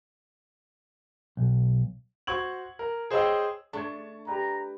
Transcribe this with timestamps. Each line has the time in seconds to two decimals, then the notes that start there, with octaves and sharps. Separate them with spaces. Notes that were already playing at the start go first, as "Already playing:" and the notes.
1.37 B1
2.27 F#4 C5 C#6 G#6 F#7
2.79 A#4
3.11 G#4 C5 C#5 D#5 G5 E6
3.73 A3 D4 A5 C#6 G#6
4.27 G4 B4 D5 A#5